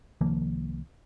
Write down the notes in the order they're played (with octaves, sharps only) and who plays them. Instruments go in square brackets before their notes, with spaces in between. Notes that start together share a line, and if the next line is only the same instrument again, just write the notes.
[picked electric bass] C2 D#3 F3 A#3